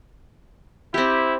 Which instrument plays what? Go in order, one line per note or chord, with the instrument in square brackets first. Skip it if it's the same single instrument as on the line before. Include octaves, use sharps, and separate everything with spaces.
[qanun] C4 G4 [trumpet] E4